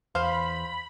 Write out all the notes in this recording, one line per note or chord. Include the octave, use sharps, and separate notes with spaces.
E2 C5 F5 B5